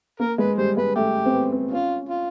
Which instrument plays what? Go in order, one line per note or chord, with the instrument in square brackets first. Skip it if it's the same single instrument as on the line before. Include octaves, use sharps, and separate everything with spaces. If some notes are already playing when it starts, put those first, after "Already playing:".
[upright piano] A#3 [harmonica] A#4
[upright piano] G#3 [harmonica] B4
[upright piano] G3 [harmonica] C5
[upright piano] G#3 [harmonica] B4
[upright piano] A3 [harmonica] G4
[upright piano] C4
B3
C4
[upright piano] C#4 [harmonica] F4
[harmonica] F4